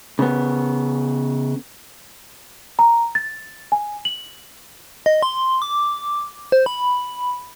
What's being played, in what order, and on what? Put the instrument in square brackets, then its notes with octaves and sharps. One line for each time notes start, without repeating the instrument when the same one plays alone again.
[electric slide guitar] C#3 B3
[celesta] A#5
A6
G#5
F#7
[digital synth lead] D#5
C6
D6
C5
B5